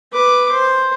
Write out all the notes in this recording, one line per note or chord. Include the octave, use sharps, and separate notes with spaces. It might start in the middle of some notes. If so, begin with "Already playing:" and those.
B4 D6
C5